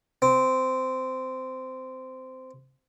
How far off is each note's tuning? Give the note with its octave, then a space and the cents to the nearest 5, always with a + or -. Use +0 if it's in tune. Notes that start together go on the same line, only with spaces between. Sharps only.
C4 -15